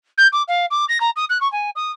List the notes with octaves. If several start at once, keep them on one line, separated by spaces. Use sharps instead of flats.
G6
D6
F5
D6
A#6
A#5
D#6
F#6
C#6
G#5
D#6